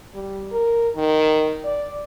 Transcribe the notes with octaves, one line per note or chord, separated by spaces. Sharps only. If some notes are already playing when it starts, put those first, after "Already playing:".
G3
A#4
D#3
D5